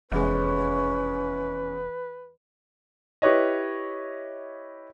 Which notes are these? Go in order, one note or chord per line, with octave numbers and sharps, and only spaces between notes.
F1 E2 G#3 C#4 B4
E4 G4 B4 C#5 D#5